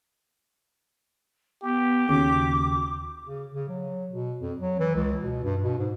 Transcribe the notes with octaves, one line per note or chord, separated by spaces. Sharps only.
B3 G4
D#2 C#3 F#4 D6
C#3
C#3
F#3
B2
F2
F#3
E3
C#2
B2
G2
B2
G#2